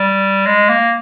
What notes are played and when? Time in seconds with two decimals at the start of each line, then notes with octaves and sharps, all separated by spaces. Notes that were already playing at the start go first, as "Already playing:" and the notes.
Already playing: G3
0.46 G#3
0.69 A#3